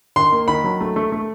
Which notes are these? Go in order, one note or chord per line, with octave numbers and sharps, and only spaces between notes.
D#3 C6
A#3
D#3 B5
F#3
A3
A3
A3